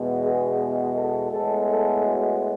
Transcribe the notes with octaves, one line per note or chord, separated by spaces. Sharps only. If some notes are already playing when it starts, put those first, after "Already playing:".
Already playing: E2 B2 G#3 B3
G#4
A4
A2 G#3 B3 A4
A4
F#4